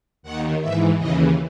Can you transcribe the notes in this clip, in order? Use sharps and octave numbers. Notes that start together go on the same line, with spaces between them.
D#2 D#3 F#5
G#2 E3 E5
D#2 C#3 E3 D#5